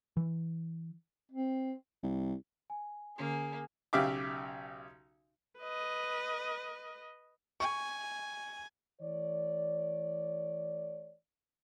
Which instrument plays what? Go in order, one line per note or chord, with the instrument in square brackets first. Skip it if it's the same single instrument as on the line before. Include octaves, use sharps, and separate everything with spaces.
[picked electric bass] E3
[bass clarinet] C4
[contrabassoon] C2
[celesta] G#5
[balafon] D3 C#4 C6 [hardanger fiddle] A#3 [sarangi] G#4
[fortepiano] B1 C#3 G4 E5 F5 D6
[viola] B4 D#5
[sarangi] G#5 [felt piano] C#6
[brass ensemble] E3 A3 C#5 D5